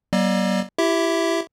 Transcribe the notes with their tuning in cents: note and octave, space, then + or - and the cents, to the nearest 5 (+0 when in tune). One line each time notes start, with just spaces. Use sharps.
F#3 +45 A#3 +40 D#5 -45
E4 +20 G4 -10 E5 +0